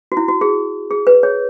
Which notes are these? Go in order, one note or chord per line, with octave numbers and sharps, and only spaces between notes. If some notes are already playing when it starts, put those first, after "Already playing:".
F#4
E4
F#4
G#4
G#4
B4
G#4 C#5